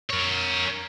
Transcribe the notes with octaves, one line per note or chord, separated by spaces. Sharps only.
A#4 C#5